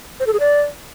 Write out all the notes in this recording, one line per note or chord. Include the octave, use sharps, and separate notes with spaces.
C5
A4
G#4
D5